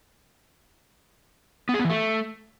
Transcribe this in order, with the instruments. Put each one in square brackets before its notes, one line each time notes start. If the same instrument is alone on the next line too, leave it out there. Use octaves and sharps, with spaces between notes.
[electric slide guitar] B3
G#4
B3
E3
A3